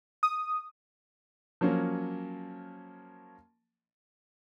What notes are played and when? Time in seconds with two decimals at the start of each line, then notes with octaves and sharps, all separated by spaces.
0.23 D#6
1.61 F3 F#3 A#3 C#4